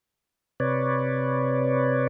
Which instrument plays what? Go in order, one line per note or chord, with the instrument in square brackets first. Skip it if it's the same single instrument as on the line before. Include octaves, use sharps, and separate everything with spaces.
[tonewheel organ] C3 B4 C#5 D5